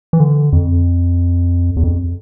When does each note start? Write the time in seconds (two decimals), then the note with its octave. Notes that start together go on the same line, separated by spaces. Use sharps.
0.13 E3
0.20 D3
0.53 F2
1.77 E2
1.84 F2